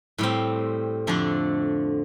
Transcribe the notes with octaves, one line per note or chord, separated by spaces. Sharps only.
A2 G3 C4
F2 D3 A3 D4